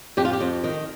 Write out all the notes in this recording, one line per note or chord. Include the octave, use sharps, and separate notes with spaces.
F2 G4
F4
G4
F2
D#3